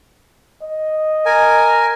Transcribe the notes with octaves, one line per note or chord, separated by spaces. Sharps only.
D#5
A#4 G#5